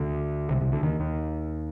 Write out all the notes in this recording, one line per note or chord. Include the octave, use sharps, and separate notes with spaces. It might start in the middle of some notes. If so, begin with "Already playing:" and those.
Already playing: D2 D3
C2 C3
C2 C3
D2 D3
D#2 D#3
D#2 D#3